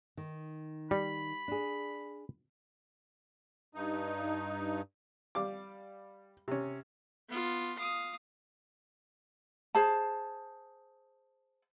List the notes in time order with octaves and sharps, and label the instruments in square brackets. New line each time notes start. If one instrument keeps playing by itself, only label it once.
[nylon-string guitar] D#3
[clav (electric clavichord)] G3 [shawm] B5
[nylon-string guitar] D4 G#4
[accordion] G2 D#4
[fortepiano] G3 F5 D6
C3 C#4
[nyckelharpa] B3 F4
F5 D#6
[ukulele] G#4 C5 A5